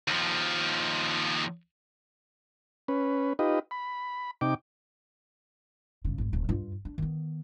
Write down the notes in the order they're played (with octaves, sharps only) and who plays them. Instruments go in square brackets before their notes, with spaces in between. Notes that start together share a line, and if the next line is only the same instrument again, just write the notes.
[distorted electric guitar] D#2 F3
[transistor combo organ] C#4 B4
D#4 F4 G4 B4 D#5
B5
C3 D#4 G5 D6
[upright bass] G1 C#3
G#1 G#3
D1
G2 F4
D4
D#3 B3